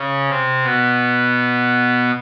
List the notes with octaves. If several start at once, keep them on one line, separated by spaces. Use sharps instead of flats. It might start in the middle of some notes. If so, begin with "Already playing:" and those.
Already playing: C#3 C#4
C3 C4
B2 B3